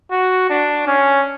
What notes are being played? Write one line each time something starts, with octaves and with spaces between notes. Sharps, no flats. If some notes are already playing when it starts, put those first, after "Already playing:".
F#4
D4
C#4